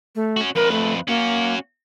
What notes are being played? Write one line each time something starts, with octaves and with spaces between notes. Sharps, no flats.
A3
C#4 F#4
F2 A#4 B4
A3
A#3 C#4 F#4